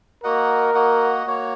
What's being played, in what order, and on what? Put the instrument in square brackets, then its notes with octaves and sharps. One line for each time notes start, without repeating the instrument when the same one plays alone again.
[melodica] A#3 F#4 D#5 F#5 [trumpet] A#4
[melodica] A#3 F#4 D#5 F#5
A#3 F#4 C#5